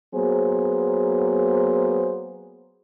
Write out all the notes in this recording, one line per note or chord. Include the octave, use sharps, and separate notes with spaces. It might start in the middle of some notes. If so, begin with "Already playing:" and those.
F#3 A#3 B3 G#4 C5